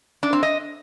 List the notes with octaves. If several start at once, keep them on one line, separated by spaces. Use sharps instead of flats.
D4
C4
D#5